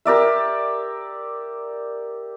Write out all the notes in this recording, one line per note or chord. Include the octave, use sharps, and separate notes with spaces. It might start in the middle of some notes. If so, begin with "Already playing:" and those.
G4 A#4 D5 E5